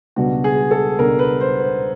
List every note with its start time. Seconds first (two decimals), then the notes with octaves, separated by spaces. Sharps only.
0.16 C#2 B2 G3 B3 D4 F#4
0.44 G#4
0.71 A4
0.99 C#2 B2 G3 B3 D4 A#4
1.19 B4
1.40 C5
1.60 C5